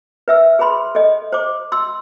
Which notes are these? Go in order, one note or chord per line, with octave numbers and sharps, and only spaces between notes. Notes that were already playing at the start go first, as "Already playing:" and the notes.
B4 E5 E6
G#4 B4 B5 C6
A4 D#5
C5 D6
C6 E6